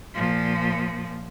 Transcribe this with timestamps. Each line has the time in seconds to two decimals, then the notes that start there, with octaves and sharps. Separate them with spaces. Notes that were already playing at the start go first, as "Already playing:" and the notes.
0.14 A#2 F3